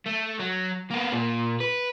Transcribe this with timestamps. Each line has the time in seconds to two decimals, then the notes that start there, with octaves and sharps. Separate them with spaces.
0.06 A3
0.40 F#3
0.91 A#3 B3
1.13 A#2
1.60 B4